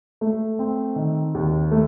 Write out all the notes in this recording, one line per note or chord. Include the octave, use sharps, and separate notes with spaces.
A3
C4
D#3
D#2
A3